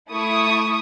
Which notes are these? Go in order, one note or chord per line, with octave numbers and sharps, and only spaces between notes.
A3 E4 C#6 D#6